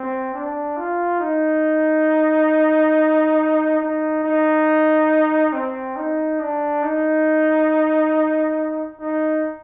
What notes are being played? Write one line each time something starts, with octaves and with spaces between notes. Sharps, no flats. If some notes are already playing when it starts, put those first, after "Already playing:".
Already playing: C4
D4
F4
D#4
D#4
D#4
C4
D#4
D4
D#4
D#4